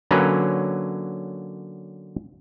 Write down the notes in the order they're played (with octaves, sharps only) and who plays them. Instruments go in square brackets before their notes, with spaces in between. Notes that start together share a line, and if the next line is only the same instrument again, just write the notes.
[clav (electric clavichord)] D3 F#3 A#3 C#4 B4 A#5